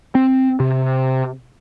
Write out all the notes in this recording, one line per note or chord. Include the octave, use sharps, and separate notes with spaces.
C4
C3